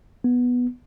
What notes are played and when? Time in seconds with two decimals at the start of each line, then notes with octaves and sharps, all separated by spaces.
0.24 B3